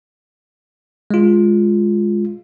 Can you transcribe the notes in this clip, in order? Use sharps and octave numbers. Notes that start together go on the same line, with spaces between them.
G#3 F4